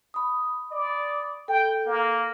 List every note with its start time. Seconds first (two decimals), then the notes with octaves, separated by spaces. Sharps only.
0.14 B5 D#6
0.71 D5
1.48 A4 G5
1.86 A#3